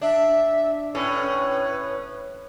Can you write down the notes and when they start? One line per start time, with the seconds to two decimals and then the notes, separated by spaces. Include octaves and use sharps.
0.01 D4 E5
0.95 A2 C#4 B4